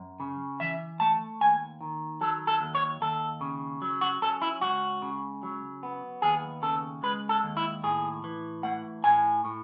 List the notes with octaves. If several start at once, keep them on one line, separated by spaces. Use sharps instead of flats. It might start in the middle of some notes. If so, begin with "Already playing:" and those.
Already playing: F#2
C#3
E3 E5
A3 A5
D#2 G#5
D#3
F#3 A4
A4
D#2
C#5
D#2 A4
C#3
F#3
F#4
C#4 A4
E4
C#2 F#4
C#3
F#3
B3
D#2 G#4
C#3 A4
G#3 B4
A4
D#2
E4
A2 G#4
E3
A3 F#5
A2 G#5
A2